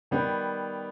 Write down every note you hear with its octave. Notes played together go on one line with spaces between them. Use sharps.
D#3 G3 B3